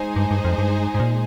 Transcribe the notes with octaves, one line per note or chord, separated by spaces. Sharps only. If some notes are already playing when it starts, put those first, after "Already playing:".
Already playing: G#3 D#4 G#4 C5
G2
G2
F2
G2
G#2
A#2